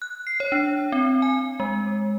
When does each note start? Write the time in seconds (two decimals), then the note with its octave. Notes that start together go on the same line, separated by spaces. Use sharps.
0.02 F#6
0.27 C7
0.40 C#5
0.52 D4
0.92 C4
1.22 G#5
1.60 G#3